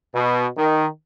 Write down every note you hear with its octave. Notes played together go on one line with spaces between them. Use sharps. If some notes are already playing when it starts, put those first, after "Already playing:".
B2
D#3